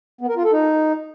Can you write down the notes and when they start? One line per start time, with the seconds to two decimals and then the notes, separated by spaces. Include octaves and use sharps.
0.21 B3
0.29 A#4
0.37 F4
0.44 A4
0.52 D#4